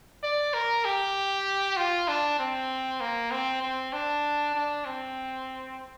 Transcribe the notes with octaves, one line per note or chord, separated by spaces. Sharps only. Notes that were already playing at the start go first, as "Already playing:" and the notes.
D5
A#4
G4
F4
D4
C4
A#3
C4
C4
D4
D4
C4